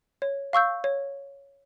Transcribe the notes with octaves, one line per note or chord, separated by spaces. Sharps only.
C#5
F5 C#6 E6 G6
C#5